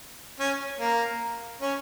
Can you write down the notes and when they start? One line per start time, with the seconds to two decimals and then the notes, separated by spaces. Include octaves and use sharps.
0.40 C#4
0.80 A#3 A#4
1.61 C#4 C#5